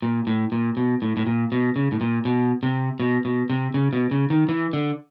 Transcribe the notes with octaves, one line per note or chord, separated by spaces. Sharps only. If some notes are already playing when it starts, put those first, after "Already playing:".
A#2
A2
A#2
B2
A2
A2
A#2
B2
C#3
A2
A#2
B2
C3
B2
B2
C3
C#3
B2
C#3
D#3
E3
D3